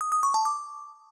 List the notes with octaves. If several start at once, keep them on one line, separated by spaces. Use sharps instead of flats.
D#6
D#6
C#6
A5
D6